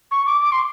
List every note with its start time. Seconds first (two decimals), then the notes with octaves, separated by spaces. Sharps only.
0.11 C#6
0.26 D6
0.42 D6
0.52 C6